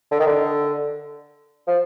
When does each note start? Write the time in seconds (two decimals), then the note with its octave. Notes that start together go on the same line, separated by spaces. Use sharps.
0.11 D3
0.19 D#3
0.26 D3
1.67 F3